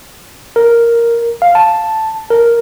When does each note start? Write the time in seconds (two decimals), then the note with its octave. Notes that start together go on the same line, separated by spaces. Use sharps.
0.56 A#4
1.42 F5
1.55 A5
2.30 A#4